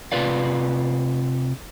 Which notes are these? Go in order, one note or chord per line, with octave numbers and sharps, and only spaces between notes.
C3 A3 F4 B4 D5 F5